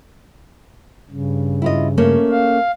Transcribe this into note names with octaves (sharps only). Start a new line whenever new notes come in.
G2 C#3
E4 F4 D#5
A3 A#3 C#4
F5